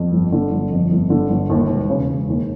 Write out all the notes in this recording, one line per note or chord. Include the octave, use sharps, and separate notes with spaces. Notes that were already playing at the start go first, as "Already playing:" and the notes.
Already playing: F2
G1
D3
G1
F2
G1
D3
G1
D#2
E1
C#3
E1
D#2